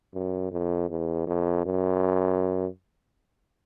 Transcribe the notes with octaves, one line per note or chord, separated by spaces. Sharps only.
F#2
F2
E2
F2
F#2